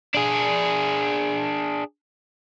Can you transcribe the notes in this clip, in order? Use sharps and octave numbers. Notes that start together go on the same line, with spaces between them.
D4 G#4